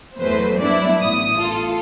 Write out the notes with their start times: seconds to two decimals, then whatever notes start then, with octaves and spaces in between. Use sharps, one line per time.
0.19 E2 F#3 A3 B4 C5
0.61 F#3 G3 B3 D4 E4 D5
1.00 A1 D#6
1.37 F4 A4